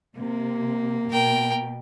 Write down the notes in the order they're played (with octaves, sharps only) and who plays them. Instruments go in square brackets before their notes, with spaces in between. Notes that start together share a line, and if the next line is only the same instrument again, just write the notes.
[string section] C3 [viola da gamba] A#3
[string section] B2 [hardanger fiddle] A#4 G5